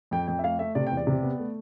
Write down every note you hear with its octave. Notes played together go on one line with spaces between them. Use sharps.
F2 G5
F2 G5
E5
A3 F5
A3 E5
C3 D5
G5
E2
D5
C3
B3
A3